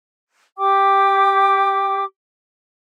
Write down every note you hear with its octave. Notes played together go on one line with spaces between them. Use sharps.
G4 G5 D6